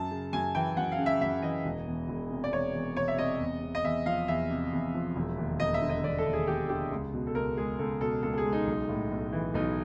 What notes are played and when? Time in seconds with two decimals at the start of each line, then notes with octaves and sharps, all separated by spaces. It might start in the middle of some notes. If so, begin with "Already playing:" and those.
Already playing: F#2 A5
0.11 C#3
0.33 F#2 G#5
0.55 E3 G5
0.77 F#2 F#5
0.92 F5
0.98 C#3
1.06 E5
1.21 F#2 E5
1.42 E3 D#5
1.65 E1
1.87 E2
2.09 E1
2.31 C3
2.44 D5
2.52 E1 C#5
2.75 E2
2.96 E1 C#5
3.08 E5
3.18 C3 D#5
3.40 E2
3.62 C3
3.75 D#5
3.84 E2 E5
4.06 F3 F5
4.28 E2 E5
4.50 C3
4.73 E2
4.94 F3
5.16 E1
5.38 D#2
5.60 E1 D#5
5.74 E5
5.82 D3
5.89 D#5
6.04 E1 D5
6.18 A4
6.25 D#2
6.33 G#4
6.47 E1 G4
6.69 D3 G4
6.92 C#2
7.14 B2
7.27 A4
7.35 C#2 A#4
7.57 G#3 G#4
7.79 C#2 A4
8.01 B2 A4
8.23 C#2 A4
8.33 A4
8.38 G#4
8.45 G#3
8.53 D#4
8.67 B1
8.89 A2
9.11 B1
9.33 E3
9.54 B1 D#4